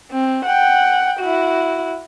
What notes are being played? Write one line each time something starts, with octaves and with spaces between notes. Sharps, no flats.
C4
F#5 G5
E4 F#4